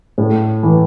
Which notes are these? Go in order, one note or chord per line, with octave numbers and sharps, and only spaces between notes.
A2
E3